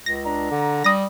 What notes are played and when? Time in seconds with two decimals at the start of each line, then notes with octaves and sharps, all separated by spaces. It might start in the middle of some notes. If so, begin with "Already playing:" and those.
0.06 C#2 A#6
0.25 D4 A#5
0.51 D3
0.84 G3 D#6 A#6